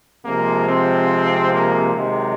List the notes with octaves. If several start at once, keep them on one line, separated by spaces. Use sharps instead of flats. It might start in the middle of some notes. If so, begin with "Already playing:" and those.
C3 F3 G#3 A#3
C4
A#3
C3 D#3 F#3 G#3